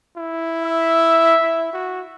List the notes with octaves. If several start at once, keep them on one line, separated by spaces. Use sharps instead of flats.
E4
E5
E4
F#4